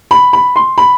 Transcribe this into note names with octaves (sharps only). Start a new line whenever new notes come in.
B5
B5
C6
B5